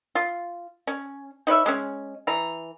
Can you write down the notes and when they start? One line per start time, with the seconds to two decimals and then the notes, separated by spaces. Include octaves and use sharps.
0.15 F4
0.87 C#4
1.47 D#4 B4 C#5 E5
1.66 G#3 C#4
2.27 E3 A#5